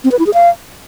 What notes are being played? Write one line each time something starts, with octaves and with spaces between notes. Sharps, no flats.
C4
B4
E4
G#4
F5